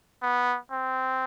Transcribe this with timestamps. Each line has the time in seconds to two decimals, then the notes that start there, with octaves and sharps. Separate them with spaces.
0.22 B3
0.71 C4